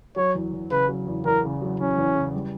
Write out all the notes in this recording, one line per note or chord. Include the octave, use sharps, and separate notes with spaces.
F#3 C#5
E2
E2
C#3 B4
F#3
E2
E2 A#4
C#3
F#3
E2 C#4
E2
C#3
G3